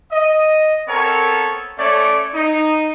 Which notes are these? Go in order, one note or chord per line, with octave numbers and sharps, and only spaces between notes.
D#5
B3 C4 A4 A#4 C#5
A3 C#4 C#5 D5
D#4